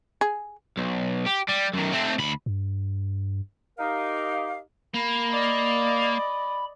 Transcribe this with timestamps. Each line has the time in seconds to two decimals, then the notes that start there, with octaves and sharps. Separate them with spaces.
0.21 G#4
0.77 B1
1.26 G4
1.49 G3
1.73 F#2 D#3
1.93 A3 C4
2.18 D2 B5
2.46 G2
3.78 D#4 G4 A#4 F5
4.94 A#3 B5
5.31 D5 D#5